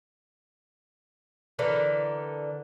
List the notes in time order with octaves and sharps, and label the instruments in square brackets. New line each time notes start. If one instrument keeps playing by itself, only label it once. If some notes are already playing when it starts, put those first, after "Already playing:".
[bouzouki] D3 E3 A4 A#4